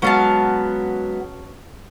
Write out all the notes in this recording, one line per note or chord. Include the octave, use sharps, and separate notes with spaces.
F#3 G#3 B3 C#4 F5 A5